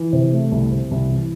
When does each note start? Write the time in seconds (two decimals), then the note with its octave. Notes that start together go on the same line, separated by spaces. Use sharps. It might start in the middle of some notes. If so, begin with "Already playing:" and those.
Already playing: E3
0.13 C3
0.33 A3
0.52 C2
0.71 C3
0.91 C2
1.09 E3